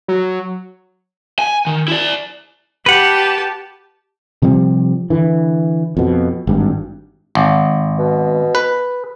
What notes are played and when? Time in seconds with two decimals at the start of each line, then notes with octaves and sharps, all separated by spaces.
0.08 F#3
1.39 G#5
1.67 D#3
1.88 E4 D5
2.86 G4 B4 F#5 A5
4.42 C3 F3 G3 C4
5.10 D3 E3
5.97 F2 B2
6.47 G#1 G2
7.35 G#1
7.99 B2
8.55 B4